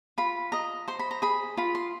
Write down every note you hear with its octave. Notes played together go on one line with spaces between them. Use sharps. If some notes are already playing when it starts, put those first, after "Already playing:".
F4 B5
D#5 A#5
C5 C6
B5
A#5
G#4 B5
F4 B5
C6